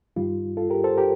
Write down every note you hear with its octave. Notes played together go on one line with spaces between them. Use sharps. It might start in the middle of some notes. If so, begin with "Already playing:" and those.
G2 D#3 G3 F4
F4 A4
G4 A#4
A4 C5
G4 A#4